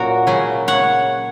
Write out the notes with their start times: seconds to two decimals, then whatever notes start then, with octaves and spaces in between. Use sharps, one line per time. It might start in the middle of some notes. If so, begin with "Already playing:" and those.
Already playing: A#2 F#3 A#3 C#4 F#4 A#4
0.27 C#3 F#3 C#4
0.68 C#5 F#5